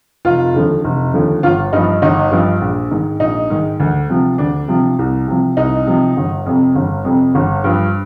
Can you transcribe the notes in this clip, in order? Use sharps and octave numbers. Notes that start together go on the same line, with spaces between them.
F1 F4
D#2 D3 F3
F1
D#2 D3 F3
G1 F4
G2 F3 D#4
G1 D#4
G2 F3
A#1
G#2 D#3
A#1 D#4
G#2 D#3
D2
C3 F3
D2 D4
C3 F3
C2
C3 F3
C2 D#4
C3 F3
G1
F2 C3
G1
F2 C3
G1
G2 F3